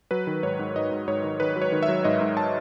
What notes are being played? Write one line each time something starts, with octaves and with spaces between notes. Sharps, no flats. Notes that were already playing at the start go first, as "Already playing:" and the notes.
F#3 B4
D#3
G#2 C#5
G#2
G#2 D#5
G#2
G#2 C#5
D#3
D#3 B4
F#3
C#5
D#3
E5
F#3
G#2 D#5
G#2
A5